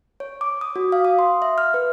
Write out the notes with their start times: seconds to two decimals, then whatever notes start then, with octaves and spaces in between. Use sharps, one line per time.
0.20 C#5
0.41 D6
0.61 D#6
0.76 F#4
0.92 F5
1.05 D#6
1.19 C6
1.42 E5
1.58 F6
1.74 B4